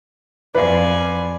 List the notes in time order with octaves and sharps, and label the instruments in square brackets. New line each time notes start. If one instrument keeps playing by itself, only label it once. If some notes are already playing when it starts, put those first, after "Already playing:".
[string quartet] F2 [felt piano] B4 [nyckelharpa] D5 G#5